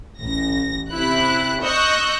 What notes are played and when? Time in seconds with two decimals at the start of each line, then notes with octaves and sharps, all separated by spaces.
0.21 A1 A#6
0.91 C3 E4 F#6
1.63 D#5 C#6 E6 F#6 G6 A#6